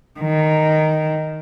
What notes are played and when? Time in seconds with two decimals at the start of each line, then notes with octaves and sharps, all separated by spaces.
0.20 D#3